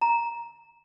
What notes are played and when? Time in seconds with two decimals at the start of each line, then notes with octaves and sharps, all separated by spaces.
0.01 A#5